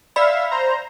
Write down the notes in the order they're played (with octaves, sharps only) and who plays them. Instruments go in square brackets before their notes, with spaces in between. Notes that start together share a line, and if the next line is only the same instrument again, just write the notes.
[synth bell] D5 B5 [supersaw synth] E5 F5
[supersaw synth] C5 A#5